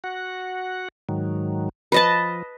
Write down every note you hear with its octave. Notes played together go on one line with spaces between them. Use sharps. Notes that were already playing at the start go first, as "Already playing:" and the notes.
F#4 F#5
G#2 D#3 F#3
F3 B4 D#5 A5